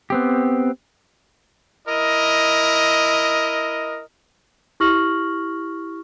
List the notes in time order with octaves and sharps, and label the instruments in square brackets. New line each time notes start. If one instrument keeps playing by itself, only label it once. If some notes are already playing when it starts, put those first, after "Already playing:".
[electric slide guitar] B3 C4 G4
[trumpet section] E4 A#4 D#5
[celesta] E4 G4 C#6 F6 A#6 F#7